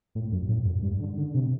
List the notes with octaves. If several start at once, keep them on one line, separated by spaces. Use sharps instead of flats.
A2
F#2
A2
F#2
G2
D3
D3
C3